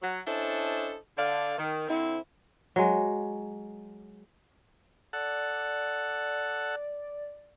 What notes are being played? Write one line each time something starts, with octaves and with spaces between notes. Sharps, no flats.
F#3
C#4 D4 E4 A4 C5 D#5
D3 D5 F5
D#3
D3 C4 E4
F#3 G#3
A4 D5 F#5